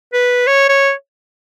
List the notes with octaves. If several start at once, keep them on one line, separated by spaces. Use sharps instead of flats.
B4
C#5
C#5